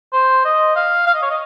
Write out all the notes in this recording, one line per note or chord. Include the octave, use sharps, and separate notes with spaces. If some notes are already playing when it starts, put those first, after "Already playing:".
C5
D#5
F5
F5
D#5
C#5
D#5